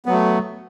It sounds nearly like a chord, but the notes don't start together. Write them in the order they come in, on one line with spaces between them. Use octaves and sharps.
B3 F#3 A3